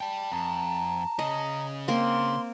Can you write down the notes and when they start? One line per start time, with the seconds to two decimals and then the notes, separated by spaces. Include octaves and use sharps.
0.01 D5 G5 A5
0.32 F2 A#5
1.19 C#3 C#4 D#5
1.88 A#3 C4 C6